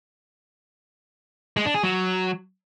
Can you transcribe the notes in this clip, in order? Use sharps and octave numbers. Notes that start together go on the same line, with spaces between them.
G#3
D4
G#4
F#3